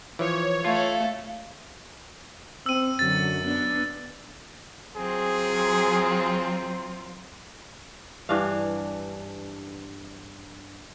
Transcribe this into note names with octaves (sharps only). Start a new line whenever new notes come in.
E3 F3 C#5
A3 F4 A4 F5
C4 E6 D#7
F#2 D3 F#3 A6
B3 D4
F#3 C4 F4 G#4
G2 E3 D4 F5